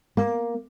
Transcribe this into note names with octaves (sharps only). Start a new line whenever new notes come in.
A#3